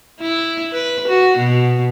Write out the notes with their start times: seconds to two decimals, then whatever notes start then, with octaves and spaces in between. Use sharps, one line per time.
0.20 E4
0.73 B4
1.08 F#4
1.37 B2